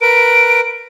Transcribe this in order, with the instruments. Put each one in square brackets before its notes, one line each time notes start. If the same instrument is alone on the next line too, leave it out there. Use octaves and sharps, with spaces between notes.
[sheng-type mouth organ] A#4 B4 [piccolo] D7